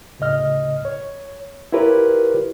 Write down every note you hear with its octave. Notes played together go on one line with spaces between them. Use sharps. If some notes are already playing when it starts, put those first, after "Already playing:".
D2 A2 C#3 D#5 F6
C#5
E4 F4 G4 A#4 B4 C#5